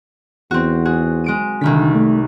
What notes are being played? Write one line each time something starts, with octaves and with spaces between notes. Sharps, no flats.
E2 C4 F#4
F#4 G#4
G#3 D7 D#7
C2 D3 D#3 B6
A3